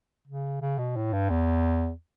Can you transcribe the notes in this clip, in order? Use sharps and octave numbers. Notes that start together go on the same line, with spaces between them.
C#3
C#3
B2
A2
G2
E2